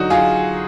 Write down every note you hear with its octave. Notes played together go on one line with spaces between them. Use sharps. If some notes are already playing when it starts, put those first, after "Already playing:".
Already playing: D3 F#3 D#4 F#4
F4 G#4